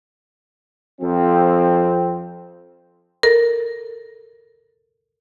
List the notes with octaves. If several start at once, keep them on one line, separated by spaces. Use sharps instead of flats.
F2 F3 C4
A4 A#4